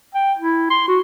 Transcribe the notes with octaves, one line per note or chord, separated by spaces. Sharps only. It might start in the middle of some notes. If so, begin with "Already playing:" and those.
G5
E4
C6
F#4